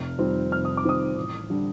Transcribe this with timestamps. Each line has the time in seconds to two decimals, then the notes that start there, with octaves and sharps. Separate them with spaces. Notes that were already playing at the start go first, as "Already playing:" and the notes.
Already playing: F1 F6
0.18 F2 D#3 G3 C4
0.52 F1 F6
0.65 D#6
0.77 D6
0.84 F2 D#3 G3 C4 D#6
1.16 A1
1.50 D3 G3